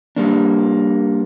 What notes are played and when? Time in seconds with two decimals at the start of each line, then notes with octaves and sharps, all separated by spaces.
0.16 G3 A#3 D4